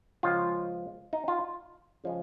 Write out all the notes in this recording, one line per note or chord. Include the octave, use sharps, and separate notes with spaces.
C#2 C#3 F3 G#3 F4
D#4
F4
C#3 F3 G#3